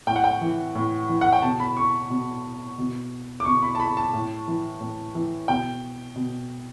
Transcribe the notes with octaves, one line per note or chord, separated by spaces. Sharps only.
A2 G5
F#5
G5
E3
A2
E3
F#5
G5
B2 A5
B5
C#6
B2
B2
D6
B2 C#6
B5
A5
B5
A5
A2
E3
A2
E3
B2 G5
B2